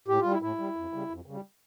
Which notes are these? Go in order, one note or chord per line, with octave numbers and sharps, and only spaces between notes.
A2 G4
G3 F4
E4
A2 E4
G3
F2
C#3 G3
F2
C#3 G3